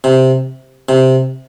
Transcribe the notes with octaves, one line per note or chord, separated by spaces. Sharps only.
C3
C3